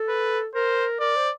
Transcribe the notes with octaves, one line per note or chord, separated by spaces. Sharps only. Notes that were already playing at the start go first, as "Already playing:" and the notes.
Already playing: A4
B4
A#4 C5
A#4 D5
C5